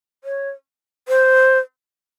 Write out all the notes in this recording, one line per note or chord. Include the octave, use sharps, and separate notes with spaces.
C#5
C5